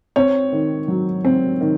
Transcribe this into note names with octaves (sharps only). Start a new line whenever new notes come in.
C4 C#5
D#3
F#3
C4
D#3